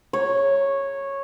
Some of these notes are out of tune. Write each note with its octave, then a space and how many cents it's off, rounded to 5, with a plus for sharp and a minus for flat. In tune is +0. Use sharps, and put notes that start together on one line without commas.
C#5 -10